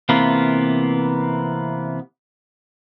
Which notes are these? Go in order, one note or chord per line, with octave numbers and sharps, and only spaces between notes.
C3 E3 A#3 B3 F4